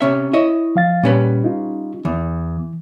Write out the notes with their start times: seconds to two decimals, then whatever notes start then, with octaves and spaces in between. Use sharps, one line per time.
0.01 C3 C#4 E5
0.33 E4 C#5 D#5 E5
0.76 F3 F5 A6
1.03 A#2 G3 C#4 B4
1.44 D#4 F4
2.05 E2 E3